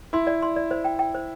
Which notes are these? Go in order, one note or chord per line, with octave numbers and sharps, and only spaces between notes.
E4 C6
D5
C6
D5
C5
G5
G5
C5